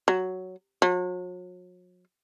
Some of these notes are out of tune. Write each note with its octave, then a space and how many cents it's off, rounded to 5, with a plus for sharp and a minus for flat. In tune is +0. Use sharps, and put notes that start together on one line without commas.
F#3 +5
F#3 -40